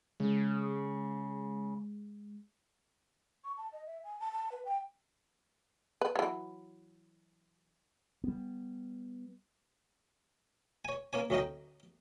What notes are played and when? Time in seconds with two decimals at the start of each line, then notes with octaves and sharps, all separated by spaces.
0.20 C#3 G#3
3.44 C#6
3.57 A5
3.73 D#5
3.86 E5
4.04 G#5
4.20 A5
4.32 A5
4.52 B4
4.65 G5
6.01 B4
6.16 E3 F#3
8.24 G3 B3
10.85 C#5 G#5
11.13 A#3 C#4 C#5 G#5
11.30 D2 F#3 C#4 D#4 D#5 G5